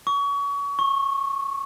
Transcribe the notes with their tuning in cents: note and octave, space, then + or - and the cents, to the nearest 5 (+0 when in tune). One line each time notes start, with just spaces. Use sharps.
C#6 +30
C#6 -20